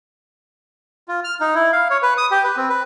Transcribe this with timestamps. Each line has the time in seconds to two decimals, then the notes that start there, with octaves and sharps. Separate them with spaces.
1.08 F4
1.24 F6
1.40 D#4
1.55 E4
1.73 F5
1.90 C#5
2.02 B4
2.18 D#6
2.31 G4
2.44 B4
2.57 C4
2.70 B4